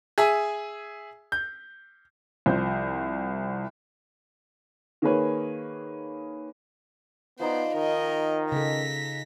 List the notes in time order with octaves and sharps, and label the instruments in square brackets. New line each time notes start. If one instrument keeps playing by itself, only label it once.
[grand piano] G#4 E5 G#5
G6
[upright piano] C2 F3 C5 G6
D#3 A#3 G#4 B4 C#5
[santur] F3 D#4 B5 [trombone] B3 [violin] C5 D5
[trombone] D#3 [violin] A#4 D#5
[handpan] C#3 A4 [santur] F#5 G#5 [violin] A#6 B6